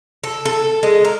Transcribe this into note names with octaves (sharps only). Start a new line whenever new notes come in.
A4
A4
G#3
A#4